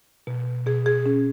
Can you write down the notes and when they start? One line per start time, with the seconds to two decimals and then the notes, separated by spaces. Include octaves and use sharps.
0.27 B2
0.66 B2 G#4
0.86 G#4
1.06 C#4